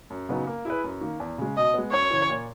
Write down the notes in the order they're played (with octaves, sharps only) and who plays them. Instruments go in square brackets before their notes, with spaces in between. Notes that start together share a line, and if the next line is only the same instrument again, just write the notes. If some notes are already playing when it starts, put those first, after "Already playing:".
[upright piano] F#2
C#3 F#3 B3 D#4
A#3
E4 G#4 B4
F#2
D#3 A#3
E2
C#3 G#3
[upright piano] B2 [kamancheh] D#5
[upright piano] G#3 B3
[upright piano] F#2 [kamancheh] C#5
[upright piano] C#3 E3
A#2